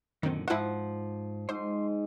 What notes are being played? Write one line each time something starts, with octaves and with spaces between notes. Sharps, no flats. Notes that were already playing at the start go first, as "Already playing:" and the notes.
F#2 A#2 D3 D#3 C4
F2 G#2 F3 E4 C5 F#5
G#2 C5 C6